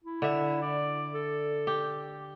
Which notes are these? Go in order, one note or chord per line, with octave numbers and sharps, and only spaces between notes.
E4
D3 E5
D5
A4
G4